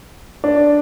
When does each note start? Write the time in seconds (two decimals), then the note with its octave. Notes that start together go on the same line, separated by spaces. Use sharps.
0.44 D4